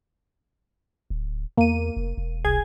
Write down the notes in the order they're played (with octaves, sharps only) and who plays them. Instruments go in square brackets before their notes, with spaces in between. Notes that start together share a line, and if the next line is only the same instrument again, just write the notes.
[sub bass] D1
[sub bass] E2 [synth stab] A#3 D#7
[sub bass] F1
E1
[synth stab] C2 G#4 G#6